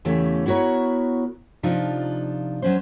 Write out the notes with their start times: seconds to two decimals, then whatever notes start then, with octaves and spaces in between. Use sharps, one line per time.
0.05 E2 C#3 E3 A3 G4 C#5
0.46 B3 E4 F#4 A#4 C#5
1.63 C3 F3 D4 D#4 F4
2.62 F#3 C#4 C5